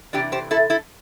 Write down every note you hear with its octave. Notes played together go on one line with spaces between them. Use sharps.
C3 E3 A3 D4 G4
G4 C5
E4 A4
E4 A4